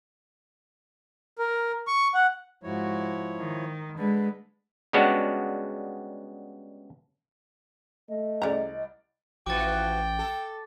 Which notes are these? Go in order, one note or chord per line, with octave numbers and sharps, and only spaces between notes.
A#4
C#6
F#5
G#2 F3 E4 F#4 C#5
D#3
D3 G#3 B4
C#3 G3 G#3 B3 D4 F#4
A3 D#5
C2 C#3 D5 A#5
A1 E3 F3 F#4 G5 D6 A6
A4